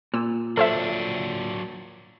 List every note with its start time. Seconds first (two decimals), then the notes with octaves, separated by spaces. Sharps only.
0.14 A#2 E6
0.57 F#3 D4 A4 C5 E5